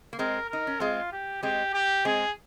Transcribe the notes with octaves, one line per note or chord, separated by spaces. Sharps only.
A#3
G#3 C4 A#4
D#4 A#4
C#4
G#3 C4 F4
G4
G#3 C4 G4
G4
G#3 C4 G#4